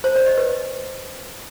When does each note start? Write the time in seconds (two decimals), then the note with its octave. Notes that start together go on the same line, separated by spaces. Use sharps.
0.04 C5
0.16 D5
0.26 D#5
0.38 B4